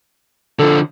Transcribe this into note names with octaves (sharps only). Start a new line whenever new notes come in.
D3 F3 A4